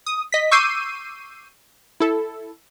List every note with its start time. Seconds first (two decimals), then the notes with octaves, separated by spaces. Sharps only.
0.06 D#6
0.32 D#5 B6
0.51 C#6 D6 E6 G6 C7 D#7
2.00 E4 A4